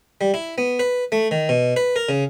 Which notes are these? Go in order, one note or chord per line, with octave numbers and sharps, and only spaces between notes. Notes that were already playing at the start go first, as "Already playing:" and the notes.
G3
E4
B3
B4
A3
D#3
B2
B4
A#4
C#3